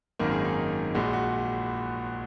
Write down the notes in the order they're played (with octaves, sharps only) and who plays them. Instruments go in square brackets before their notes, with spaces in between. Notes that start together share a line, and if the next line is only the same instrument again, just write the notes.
[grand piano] G#1 F#2 D#3 A#3
G#4
D#4
A#1 A#2 G#3 F#4
F#4